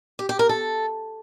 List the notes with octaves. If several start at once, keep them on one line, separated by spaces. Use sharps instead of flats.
G4
G4
A#4
A4